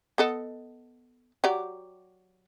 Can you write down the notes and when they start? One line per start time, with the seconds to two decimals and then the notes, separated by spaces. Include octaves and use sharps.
0.18 B3 A4 D#5
1.44 F#3 G4 D5